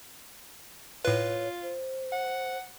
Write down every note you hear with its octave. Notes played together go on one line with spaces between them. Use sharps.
A2 F4 B4 C#5
C5
F#5